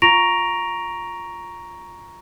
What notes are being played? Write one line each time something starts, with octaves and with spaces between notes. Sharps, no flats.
F4 A#5 C#6 A#6 D7 F7